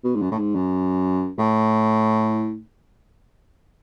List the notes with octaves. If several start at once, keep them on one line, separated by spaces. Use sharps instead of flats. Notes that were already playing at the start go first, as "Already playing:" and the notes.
B2
G#2
F#2
A2
G#2
F#2
A2